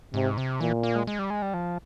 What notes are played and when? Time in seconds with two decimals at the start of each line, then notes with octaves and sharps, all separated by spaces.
0.14 G#2 C3
0.37 C3
0.60 A#2 E3
0.83 A#3
0.96 G#3
1.07 G#3
1.19 G3
1.30 G#3
1.42 G3
1.54 F3